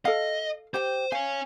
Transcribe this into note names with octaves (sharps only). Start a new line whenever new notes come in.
A4 D#5 F5
G4 C5 G5
C#5 F5 G#5